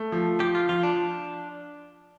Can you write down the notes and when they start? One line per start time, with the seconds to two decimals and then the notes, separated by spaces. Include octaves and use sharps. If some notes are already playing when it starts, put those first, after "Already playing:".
Already playing: A3
0.12 F3
0.40 F3 G4
0.55 F4
0.69 F3 F4
0.83 D4